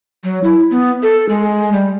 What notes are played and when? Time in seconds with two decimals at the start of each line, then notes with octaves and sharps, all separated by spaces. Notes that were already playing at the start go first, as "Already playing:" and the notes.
0.24 F#3
0.44 E4
0.71 B3
1.03 A4
1.29 G#3
1.73 G3